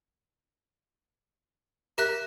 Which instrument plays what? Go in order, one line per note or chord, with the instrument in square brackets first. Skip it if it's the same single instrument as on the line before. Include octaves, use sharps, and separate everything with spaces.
[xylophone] G4 E5 F#6 [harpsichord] A#4